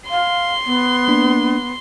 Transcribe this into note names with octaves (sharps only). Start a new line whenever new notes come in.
F5 C6
B3
A#3 D4